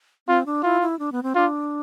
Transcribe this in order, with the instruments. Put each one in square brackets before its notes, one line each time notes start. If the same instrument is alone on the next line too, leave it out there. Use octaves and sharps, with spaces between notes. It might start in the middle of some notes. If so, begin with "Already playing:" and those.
[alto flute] C4 [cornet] F4
[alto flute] D4
[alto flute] E4 [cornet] F4
[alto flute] E4
D4
B3
C4
[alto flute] D4 [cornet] F4